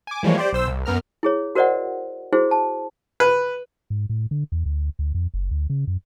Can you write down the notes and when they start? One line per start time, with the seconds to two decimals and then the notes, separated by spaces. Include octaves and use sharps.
0.07 G#5 D6
0.23 E3 F3 G3 G#3 A#3 C#5
0.38 G4 C5 D5
0.53 B1 C5 E6
0.68 C2
0.86 F#2 B3 A#4 F6
1.23 E4 G#4 C#5
1.55 F#4 A#4 C5 D5 D#5 F#5
2.33 E4 F#4 G#4 C5
2.51 A5
3.20 B4
3.90 G#2
4.09 A2
4.31 D3
4.52 E2
4.66 D2
4.99 D2
5.15 F2
5.34 F#1
5.51 D2
5.70 C#3
5.87 F#2